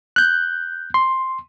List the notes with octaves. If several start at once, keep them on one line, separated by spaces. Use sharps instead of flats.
F#6 G6
C6